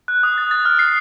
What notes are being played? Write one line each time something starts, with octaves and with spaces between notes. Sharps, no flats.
F#6
D#6
A6
A6
F6
C7